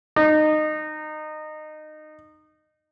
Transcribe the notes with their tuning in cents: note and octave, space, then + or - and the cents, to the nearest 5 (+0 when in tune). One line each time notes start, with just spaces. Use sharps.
D#4 -20